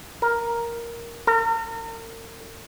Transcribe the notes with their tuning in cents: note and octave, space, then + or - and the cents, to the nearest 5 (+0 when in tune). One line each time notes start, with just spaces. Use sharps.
A#4 +5
A#4 -40